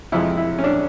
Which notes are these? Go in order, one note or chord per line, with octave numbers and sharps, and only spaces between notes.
F2 C3 F3 G#3 E4
E4
C#4
D4